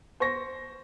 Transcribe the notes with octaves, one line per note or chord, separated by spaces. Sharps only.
C5 C#6 A#6